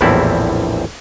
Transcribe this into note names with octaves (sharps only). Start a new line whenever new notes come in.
A#1 E2 A2 G3 C4 E4